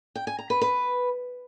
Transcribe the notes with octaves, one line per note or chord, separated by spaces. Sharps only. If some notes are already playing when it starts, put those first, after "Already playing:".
G5
G#5
A#5
B4
B4